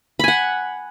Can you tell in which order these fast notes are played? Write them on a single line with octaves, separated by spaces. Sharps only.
B5 G#5 F#5